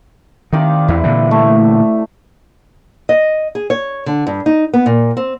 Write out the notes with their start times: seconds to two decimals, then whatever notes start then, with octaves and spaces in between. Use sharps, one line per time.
0.53 C3 D#3 D5 F5
0.88 E2 E4
1.04 A#2 D3 E3
1.31 A3
3.09 D#5
3.55 G#4
3.70 C#5
4.06 D3
4.27 G2
4.46 D#4
4.74 B3
4.86 A#2
5.17 C4